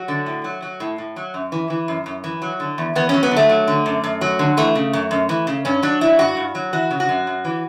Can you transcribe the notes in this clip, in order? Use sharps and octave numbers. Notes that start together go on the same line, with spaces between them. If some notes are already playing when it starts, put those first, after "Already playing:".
Already playing: F#3 F#4
D3
A2
F#3
F#3
A2
A2
F#3
F#2
E3
E3
F#2
F#2
E3
F#3
D3
E2
E2 B3
F#3 C#4
B3
D3
A3
F#3
D3
F#2
F#2
F#3
D3
E3 A3
C#3
F#2
F#2
E3
C#3
G2 C#4
F#3 D4
F#3 E4
G2 F#4
G2
F#3
E3 F#4
C#3
F#4
F#2
F#2
E3